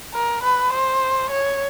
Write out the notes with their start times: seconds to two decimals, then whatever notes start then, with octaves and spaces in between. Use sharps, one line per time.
0.14 A#4
0.43 B4
0.73 C5
1.30 C#5